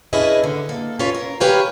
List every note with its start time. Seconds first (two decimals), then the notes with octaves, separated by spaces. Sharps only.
0.13 C#4 D4 E4 G#4 B4 D#5
0.44 D3
0.69 A#3 A4
0.99 C#4 F4 A4 B4 C#5
1.15 A#4
1.40 G4 A#4 B4 C#5 F5 G#5